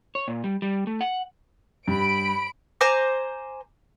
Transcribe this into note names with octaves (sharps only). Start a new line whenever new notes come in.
C#5
A#2
G3
G3
A3
F#5
G2 B5 D7
C5 G#5 A#5 D6